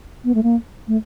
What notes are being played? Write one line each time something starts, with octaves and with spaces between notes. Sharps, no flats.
B3
A3
A#3
A3